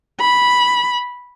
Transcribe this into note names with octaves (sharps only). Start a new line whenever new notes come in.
B5